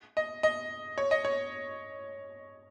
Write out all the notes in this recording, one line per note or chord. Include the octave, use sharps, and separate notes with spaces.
D#5
D#5
C#5
D#5
C#5